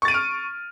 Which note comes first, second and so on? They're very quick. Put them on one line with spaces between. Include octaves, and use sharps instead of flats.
C#6 A6 D#7 D7 F6